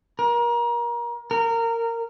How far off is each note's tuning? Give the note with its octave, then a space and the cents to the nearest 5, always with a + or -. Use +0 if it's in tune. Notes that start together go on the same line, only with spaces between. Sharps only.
A#4 +30
A#4 -20